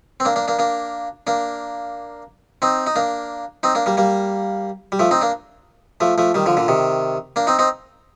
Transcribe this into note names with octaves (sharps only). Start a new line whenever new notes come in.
C4
A#3 D4
A#3 D4
A#3 D4
A#3 D4
A#3 D4
C4 D#4
D#4
A#3 D4
C4 D#4
A#3 D4
G3 A#3
G3 A#3
G3
F3 A3
C4 D#4
A#3 D4
F3 A3
F3 A3
D#3 G3
D3 F3
A#2 D3
C3 D#3
A#3 D4
C4 D#4
C4 D#4